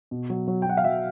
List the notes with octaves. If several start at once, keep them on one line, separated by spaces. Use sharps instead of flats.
B2
F#3
F#3
G5
F#3 F#5
F5
F#3 E5